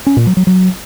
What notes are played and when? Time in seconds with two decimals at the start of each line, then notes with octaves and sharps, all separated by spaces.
0.06 C#4
0.17 A#2
0.27 F#3
0.37 F#3
0.47 F#3